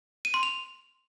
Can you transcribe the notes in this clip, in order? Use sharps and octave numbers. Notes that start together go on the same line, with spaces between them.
D#7
C6
F7